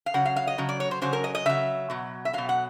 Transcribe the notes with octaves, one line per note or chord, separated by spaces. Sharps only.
F5
C#3 F#3 F#5
F5
F5
D#5
C#3 F#3
D5
C#5
C5
C#3 F#3 C5
A#4
D#5
D#5
C#3 F#3 E5
B2 F#3
E5
B2 F#3 F5
F#5